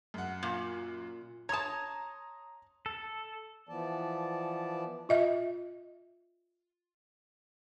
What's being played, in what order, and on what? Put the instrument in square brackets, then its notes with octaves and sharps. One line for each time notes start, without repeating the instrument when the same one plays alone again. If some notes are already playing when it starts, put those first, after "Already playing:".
[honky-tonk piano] F#2 F#5
[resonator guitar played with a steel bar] A#2
[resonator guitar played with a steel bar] C#5 A5 [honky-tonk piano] A#5 C6 D#6
[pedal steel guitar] A4
[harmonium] E3 F3 B3 D5 A5
[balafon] F4 D#5 E5